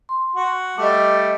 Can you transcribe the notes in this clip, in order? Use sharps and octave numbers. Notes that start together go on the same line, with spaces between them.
C6
F#4
G3 A3 D#5 D6